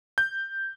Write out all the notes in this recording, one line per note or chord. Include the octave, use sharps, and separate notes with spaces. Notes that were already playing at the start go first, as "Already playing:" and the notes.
G6